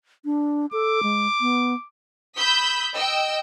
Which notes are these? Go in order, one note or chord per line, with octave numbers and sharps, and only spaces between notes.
D4
A4 D6
G#3
B3
B5 D#6 E6 G6 B6
D#5 G5 E6